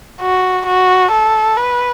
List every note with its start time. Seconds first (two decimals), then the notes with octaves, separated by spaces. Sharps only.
0.21 F#4
0.66 F#4
1.11 A4
1.57 B4